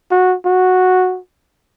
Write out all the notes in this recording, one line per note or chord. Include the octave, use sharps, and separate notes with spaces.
F#4
F#4